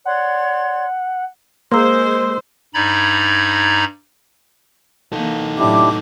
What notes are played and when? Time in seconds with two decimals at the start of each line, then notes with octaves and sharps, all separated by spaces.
0.05 C#5 D5 F#5 C6
1.72 G#3 A#3 C5 C6 E6
2.74 G2 D#4 D5 A#5 B5 G#6
5.12 E3 A#3 D#4 A4
5.58 A2 F#3 D4 E4 G4 D6